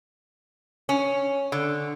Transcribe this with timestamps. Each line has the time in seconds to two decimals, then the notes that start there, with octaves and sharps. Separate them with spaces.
0.89 C#4
1.52 D3